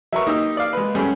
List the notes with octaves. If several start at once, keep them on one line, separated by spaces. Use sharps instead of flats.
F#3 A#4 B4 E5 C#6
A#3 D#4 G4 E6
D5 F5
G#3 B4
F#2 G3 A3 C#4 G#4